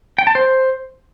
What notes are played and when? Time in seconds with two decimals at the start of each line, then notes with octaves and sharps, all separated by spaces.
0.18 G5
0.27 A5
0.35 C5